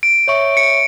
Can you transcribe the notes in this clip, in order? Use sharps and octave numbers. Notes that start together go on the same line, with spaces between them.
D7
C#5 E5 C#6
C#7